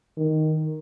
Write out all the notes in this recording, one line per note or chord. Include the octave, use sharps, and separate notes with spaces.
D#3